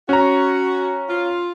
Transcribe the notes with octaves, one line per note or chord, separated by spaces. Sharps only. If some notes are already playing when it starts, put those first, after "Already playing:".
C#4 F#4 A#5
F4